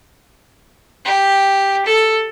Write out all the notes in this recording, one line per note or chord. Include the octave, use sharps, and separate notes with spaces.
G4
A4